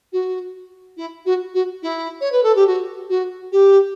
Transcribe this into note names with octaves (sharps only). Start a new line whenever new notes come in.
F#4
E4
F#4
F#4
E4
C#5
B4
A4
G4
F#4
F#4
G4